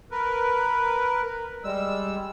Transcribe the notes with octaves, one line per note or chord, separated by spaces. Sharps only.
A#4 B4
G3 G#3 E6